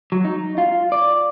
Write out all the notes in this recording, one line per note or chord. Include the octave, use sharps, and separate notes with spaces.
F#3
D#4
F4
D5